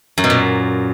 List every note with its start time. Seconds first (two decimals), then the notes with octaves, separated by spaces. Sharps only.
0.18 F#2
0.24 B2
0.30 A#2